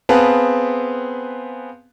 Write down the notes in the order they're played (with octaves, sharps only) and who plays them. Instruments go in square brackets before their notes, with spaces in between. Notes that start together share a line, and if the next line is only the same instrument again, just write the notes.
[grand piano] B3 C4 G#4 B4 F5 A5